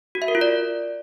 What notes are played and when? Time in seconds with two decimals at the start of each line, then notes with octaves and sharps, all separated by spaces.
0.15 F#4
0.22 E5
0.28 A#4
0.35 F4
0.41 D5